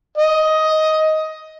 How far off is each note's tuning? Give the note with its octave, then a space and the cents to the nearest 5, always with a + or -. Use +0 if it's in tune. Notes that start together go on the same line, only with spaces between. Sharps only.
D#5 +10